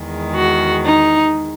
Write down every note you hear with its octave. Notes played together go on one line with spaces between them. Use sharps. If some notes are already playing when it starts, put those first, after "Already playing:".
Already playing: E2 D#3 G#3
F#4
D#4